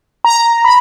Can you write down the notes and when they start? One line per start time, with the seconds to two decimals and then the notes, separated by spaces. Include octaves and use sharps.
0.24 A#5
0.64 B5